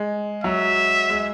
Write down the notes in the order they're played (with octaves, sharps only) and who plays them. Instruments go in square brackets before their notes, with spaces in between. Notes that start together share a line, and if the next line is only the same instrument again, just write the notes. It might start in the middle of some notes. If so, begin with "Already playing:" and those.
Already playing: [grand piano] G#3
[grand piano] F#3 [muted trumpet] E5
[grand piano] G#3